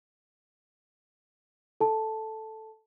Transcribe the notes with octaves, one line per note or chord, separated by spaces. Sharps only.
A4 A5